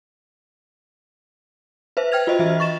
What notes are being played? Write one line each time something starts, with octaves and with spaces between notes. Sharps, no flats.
B4 C5 E5
G5 F6 G#6 F7
F4 F#4 C5 D#5 E5
E3 E5
C#6 A6 E7